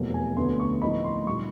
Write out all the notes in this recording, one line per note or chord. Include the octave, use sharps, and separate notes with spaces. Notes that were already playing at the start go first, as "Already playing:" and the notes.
Already playing: F1 E2 B2 F#3 A#3
G#5
D2 D3 F#3 B3 C6
C#6
A2 F3 A#3 D#4 B5
C6
A#2 G3 C#6